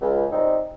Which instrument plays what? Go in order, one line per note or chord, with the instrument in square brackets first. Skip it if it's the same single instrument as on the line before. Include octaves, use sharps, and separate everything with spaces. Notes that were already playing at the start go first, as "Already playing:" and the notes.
[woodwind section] C#2
C3 G3 C4 D#4